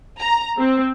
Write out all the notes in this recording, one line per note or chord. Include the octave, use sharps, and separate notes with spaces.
A#5
C4